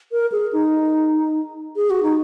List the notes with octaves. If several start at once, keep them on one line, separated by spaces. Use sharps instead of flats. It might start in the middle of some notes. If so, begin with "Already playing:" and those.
A#4
G#4
D#4
G#4
F#4
D#4